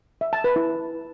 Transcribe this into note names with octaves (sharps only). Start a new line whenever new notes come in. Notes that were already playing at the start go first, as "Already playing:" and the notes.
E5
A5
B4
E4